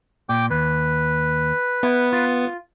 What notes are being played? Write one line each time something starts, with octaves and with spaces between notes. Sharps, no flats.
A#2 G5 D6
D#2 B4
B3 E4
F4